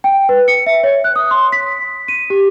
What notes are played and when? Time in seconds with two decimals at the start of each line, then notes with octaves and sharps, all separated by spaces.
0.04 G5
0.29 B4
0.48 C#7
0.66 E5
0.83 C#5
1.04 F#6
1.16 D#6
1.31 C6
1.52 B6
2.08 D#7
2.30 G4